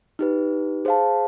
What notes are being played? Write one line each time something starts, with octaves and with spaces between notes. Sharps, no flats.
D#4 G4 B4
G#4 C5 F5 A5